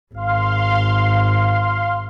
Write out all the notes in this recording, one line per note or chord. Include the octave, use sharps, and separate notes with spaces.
G#1 F5 C6